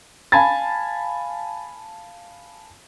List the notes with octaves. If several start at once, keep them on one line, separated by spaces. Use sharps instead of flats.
F5 G#5 A5 B5 G#6 A6